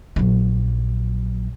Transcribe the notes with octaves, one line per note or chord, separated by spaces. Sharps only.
A#1 F#3